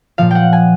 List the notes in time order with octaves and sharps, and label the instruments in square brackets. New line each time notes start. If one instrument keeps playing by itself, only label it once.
[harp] A#2 F3 F5
F#5 G5
G#5